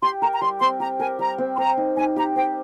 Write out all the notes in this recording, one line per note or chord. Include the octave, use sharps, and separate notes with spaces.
G4 C6
A#4 A#5
A#5
G3 C6
C4 C6
G4 A#5
A#4 G#5
G3 A#5
C4
C6
C5 A#5
D#4
D#4 G#5
G4 A#5
C5 G5